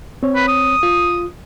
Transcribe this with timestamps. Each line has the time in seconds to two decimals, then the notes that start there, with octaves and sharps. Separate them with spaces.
0.23 C4 C#5
0.36 B4
0.48 D#6
0.83 F4